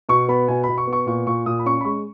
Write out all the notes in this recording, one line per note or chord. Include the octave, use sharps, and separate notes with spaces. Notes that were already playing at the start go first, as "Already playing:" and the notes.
B2 C#6
B3 B5
B2 G#5
B2 B5
C#6
B3
C#6
A#2 C#6
A#2 C#6
A#2 D#6
B5
C#4 C#6
B5
G#3 C#6